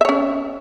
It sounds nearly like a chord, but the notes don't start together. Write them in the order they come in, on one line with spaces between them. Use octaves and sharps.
E5 C#5 C#4